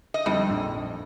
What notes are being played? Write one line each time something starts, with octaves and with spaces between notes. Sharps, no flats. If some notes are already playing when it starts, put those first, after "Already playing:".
D#5
F2 D3 G3 D#4
A#1